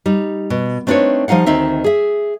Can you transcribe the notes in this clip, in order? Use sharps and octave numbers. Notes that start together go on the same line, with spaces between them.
G3 D#4
B2
A3 C4 D4 D#4 B4 C#5
F3 G3 D#4 F5 F#5
D2 D#3 C4 D#4 E5
G#4 E5